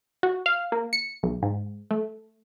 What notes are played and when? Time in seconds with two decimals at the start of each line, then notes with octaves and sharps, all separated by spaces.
0.23 F#4
0.46 F5
0.72 A#3
0.93 C#7
1.23 B1
1.42 G#2
1.91 A3